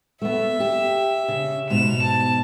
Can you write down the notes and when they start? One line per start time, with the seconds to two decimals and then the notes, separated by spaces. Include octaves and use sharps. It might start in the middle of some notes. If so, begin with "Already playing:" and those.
0.22 A3 B3 E5
0.60 G4
1.28 C#3
1.70 G#2 B2 E7 F7
2.03 A5